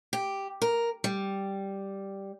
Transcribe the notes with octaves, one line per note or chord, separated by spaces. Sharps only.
G4
A#4
G3